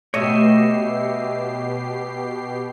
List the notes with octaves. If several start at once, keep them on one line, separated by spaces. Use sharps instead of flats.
B2 A3 G4 C#5 D#5 E5 C7